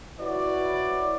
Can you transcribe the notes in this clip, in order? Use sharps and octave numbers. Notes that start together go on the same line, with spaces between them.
E4 F#4 B4 C#5 D5